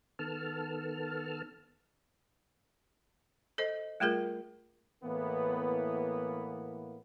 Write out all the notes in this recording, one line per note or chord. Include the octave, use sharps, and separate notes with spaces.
D#3 B3 A4 A5 F6
A4 C5 D#5
G3 A3 F4 G#4 A#4
A2 E3 A#3 B3